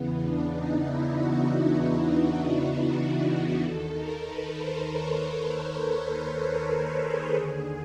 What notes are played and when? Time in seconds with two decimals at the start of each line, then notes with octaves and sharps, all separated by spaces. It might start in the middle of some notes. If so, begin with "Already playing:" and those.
Already playing: E2 C#3 E3 B3
0.20 D4
0.51 D#4
0.82 E4
1.13 F#4
1.44 E4
2.69 D4
2.99 D#4
3.30 E4
3.61 D#2 D#3 A4
3.92 A#4
4.23 B4
4.55 C5
4.86 C#5
5.17 C5
6.40 A#4
6.71 A4
7.03 G#4
7.33 D#2 D3 G#4